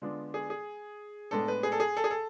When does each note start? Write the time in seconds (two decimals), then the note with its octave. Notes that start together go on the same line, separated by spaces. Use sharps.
0.02 D3 G#3 B3 D4 F4
0.34 G#4
0.50 G#4
1.31 A2 G#3 B3 D4 A4
1.48 B4
1.63 G#4
1.72 A4
1.80 G#4
1.97 A4
2.04 G#4
2.11 A4